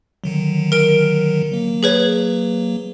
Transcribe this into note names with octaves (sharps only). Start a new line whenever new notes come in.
D3 D#3 F#3
A#4 D7
F#3 A#3
G#4 B4 C#5